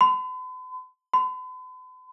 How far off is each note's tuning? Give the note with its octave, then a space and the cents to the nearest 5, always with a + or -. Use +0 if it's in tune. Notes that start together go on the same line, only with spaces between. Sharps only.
B5 +45
B5 +45